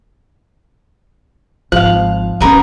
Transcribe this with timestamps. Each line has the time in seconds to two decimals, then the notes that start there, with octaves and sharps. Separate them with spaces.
1.72 G#1 F3 F5 F#6
2.41 D#3 B3 C#4 A#4 B4